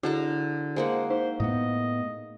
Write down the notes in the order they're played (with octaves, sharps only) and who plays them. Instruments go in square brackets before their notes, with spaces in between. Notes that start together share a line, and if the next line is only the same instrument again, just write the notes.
[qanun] D3 A5 A#5 [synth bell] E4 F#4 G#4
[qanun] G#3 A#3 F#5 [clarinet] C5
[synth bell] D#4 [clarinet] C5
[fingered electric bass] A2 A3 B3 [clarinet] D#5